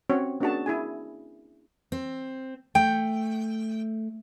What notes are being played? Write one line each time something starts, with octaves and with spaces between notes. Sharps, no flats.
C4 C#4 F#4 C#5
A#3 C#4 D4 F#4 G#4 A5
E4 G#4 G#5
C4
A3 G5